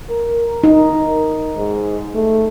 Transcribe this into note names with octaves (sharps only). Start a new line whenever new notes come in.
A#4
D#4
G#2
A3